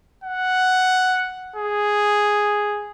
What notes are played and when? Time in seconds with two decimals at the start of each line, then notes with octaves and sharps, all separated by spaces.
0.24 F#5
1.56 G#4